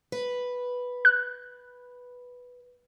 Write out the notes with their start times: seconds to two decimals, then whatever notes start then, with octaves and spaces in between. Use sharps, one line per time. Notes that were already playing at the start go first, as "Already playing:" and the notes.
0.12 B4
1.05 F#6